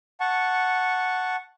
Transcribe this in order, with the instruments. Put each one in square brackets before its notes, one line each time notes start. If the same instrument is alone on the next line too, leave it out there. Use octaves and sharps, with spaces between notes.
[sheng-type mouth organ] F#5 A5 C#6